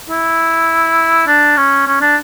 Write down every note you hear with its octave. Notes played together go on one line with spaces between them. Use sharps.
E4
D4
C#4
C#4
D4